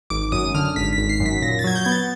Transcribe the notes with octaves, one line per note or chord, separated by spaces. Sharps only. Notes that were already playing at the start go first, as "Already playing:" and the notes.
G#1 D6
F#2 D#6
D3 F6
G#1 B6
B6
G#1
C7
F#2
B6
A#2 A#6
A6
F#3 G#6
G6
B3 G#6
A6